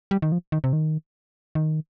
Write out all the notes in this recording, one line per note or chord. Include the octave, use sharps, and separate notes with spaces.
G3
D#3
F3
D#3
C3
D#3
D#3